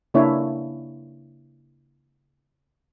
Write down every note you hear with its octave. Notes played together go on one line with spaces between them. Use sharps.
C#3 A#3 D4 E4 C#5